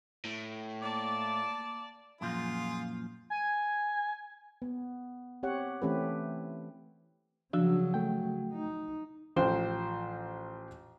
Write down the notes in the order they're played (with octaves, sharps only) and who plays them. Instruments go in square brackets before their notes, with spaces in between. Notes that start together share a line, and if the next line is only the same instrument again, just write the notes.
[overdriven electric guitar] A2
[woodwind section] A#3 D6 [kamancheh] D5 A5
[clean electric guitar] F#2 A#2 F3 [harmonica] F4 G#4
[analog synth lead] G#5
[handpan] B3
C4 G4 C#5 F#5
E3 A3 C4 C#4 G4 B4
[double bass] C#3 F#3 [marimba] F3 F#4 [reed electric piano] D4 E6
[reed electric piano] A3 G5
[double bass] D#4
[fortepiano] A1 F3 C5 G5